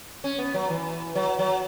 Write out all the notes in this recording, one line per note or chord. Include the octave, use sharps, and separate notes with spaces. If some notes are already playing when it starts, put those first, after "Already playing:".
C#4
B3
F#3
E3
F#3
F#3